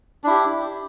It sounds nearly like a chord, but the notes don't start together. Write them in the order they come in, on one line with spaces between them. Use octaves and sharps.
D4 E4 G4